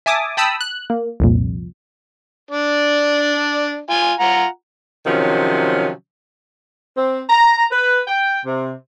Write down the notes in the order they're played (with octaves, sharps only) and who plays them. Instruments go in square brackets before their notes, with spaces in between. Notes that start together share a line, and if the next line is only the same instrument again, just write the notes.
[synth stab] E5 G#5 A5 D6 D#6
G5 A5 B5 D#6 E6
F#6
A#3
C2 F2 A#2
[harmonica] D4 D5
F4 G#5
F4 F#5 A#5
[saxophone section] C3 D#3 F3 F#3 C#4
[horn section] C4
A#5
B4
G5
C3